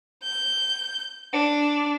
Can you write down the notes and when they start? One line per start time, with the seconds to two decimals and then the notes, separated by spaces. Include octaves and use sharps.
0.23 G6
1.33 D4